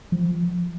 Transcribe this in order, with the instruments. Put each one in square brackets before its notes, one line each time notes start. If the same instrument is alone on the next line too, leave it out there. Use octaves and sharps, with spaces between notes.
[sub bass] F3